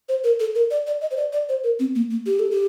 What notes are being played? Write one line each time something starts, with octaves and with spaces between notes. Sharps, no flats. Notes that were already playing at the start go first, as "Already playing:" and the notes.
C5
A#4
A4
A#4
D5
D5
D#5
C5
D5
D5
C5
A#4
C4
A#3
A#3
G4
A4
G4